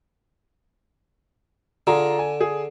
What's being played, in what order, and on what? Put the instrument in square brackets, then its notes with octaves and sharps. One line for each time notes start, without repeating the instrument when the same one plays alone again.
[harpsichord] D3 [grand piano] F4 G#4 A#5
[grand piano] G#5
G#4